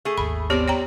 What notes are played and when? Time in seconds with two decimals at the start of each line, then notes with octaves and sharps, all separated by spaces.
0.05 A3 G#4
0.18 G#1 D#2 B5
0.50 G3 B3 C4 G4 C#5 D5
0.68 C#5 G5 A#5